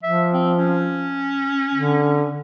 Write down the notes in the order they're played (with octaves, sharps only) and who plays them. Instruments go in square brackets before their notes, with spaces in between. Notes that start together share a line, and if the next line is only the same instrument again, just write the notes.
[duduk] F3 [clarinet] E5
[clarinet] C4
C#4
[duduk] D3